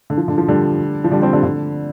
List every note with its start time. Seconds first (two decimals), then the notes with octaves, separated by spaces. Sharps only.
0.10 D3
0.17 F3
0.28 D3
0.38 F3
0.48 D3 G3
1.04 F3
1.11 D3 G3
1.22 G3 C4
1.33 D3 G3
1.43 D3